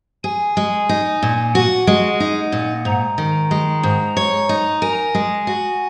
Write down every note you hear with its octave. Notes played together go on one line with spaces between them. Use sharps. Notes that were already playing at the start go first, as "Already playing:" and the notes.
G#4 G#5
G#3
D#4
A#2
F#4 F#5
G#3
D#4
A#2
G#2 A#5
D#3
G#3
G#2
C#5
D#4
A#4 G#5
G#3
F#4